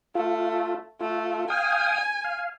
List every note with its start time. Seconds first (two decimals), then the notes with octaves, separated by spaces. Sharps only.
0.15 A3 F4
1.00 A3 F4
1.50 F5 G5 G#5 D#6
2.24 F5